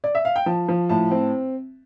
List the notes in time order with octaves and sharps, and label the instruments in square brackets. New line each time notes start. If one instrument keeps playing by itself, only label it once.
[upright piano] D5
E5
F5
G5
F3 A5
F3
A2 A5
C4